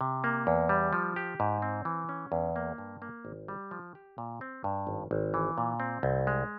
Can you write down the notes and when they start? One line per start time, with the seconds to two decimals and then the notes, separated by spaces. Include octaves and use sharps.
0.01 C3
0.24 A#3
0.47 E2
0.69 G3
0.93 F3
1.16 G4
1.40 G#2
1.62 C4
1.85 E3
2.09 C#4
2.32 E2
2.56 A#3
2.78 G2
3.02 A#3
3.25 G#1
3.48 G3
3.71 F3
3.95 G4
4.18 A#2
4.41 C4
4.64 G2
4.87 G#1
5.11 G#1
5.34 E3
5.58 A#2
5.80 C4
6.03 C2
6.27 G#3